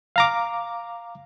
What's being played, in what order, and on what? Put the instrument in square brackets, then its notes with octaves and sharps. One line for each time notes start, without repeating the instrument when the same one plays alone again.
[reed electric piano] F5 A#5 D6